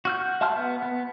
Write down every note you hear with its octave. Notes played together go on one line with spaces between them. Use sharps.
F#4 F6 G6
E5 F#5 A5 C6 F6
B3
B3